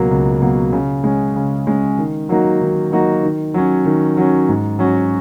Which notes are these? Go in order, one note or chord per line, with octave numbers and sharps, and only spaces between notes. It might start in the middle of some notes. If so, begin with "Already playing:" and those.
Already playing: C#2 B2 F#3 A#3
C#2
B2 F#3 A#3
C#3
G#3 C#4
C#3
G#3 C#4
D#3
F#3 A#3 D#4 F#4
D#3
F#3 A#3 D#4 F#4
D#3
F#3 C#4
D#3
F#3 C#4
G#2
F#3 C#4 F#4